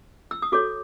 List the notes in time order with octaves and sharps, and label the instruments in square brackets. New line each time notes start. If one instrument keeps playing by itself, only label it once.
[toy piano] E6
D#6
F#4 A4 C#5 D6